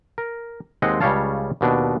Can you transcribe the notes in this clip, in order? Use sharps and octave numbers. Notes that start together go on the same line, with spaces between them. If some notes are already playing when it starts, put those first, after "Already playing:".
A#4
D#2 G#3 C4 D#5 F#5
C#2 C#3 G3 C#5 F5 A5
D#2 B2 D4